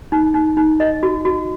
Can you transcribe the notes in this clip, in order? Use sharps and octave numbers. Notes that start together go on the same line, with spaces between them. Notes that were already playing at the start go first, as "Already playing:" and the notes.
D#4
D#4
D#4
D#5
F#4
F#4